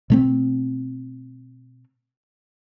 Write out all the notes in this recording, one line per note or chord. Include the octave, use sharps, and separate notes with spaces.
B2 A3 C4